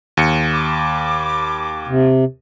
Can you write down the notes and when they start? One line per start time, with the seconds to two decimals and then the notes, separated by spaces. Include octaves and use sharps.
0.17 D#2 C#7
0.51 B5 D6
1.88 C3